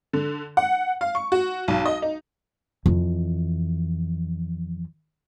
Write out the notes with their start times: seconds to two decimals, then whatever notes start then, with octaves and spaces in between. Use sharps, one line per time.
0.13 D3
0.57 F#5
1.01 F5
1.15 C#6
1.32 F#4
1.68 B1
1.86 D#5
2.02 D#4
2.86 F2 E3